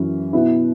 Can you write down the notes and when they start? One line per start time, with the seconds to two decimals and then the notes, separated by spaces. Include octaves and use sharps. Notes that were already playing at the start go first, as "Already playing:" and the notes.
Already playing: F#2 E3 C#4 E4
0.33 B2 B3 E4